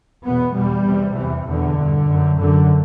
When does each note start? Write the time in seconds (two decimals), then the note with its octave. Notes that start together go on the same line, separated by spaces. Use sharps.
0.24 E2 B2 B3
0.55 E2 B2 G3
0.86 E2 C3
1.16 E2 C3 E3
1.47 E2 B2 D3
1.78 G2
2.08 F#2
2.40 F#2 D3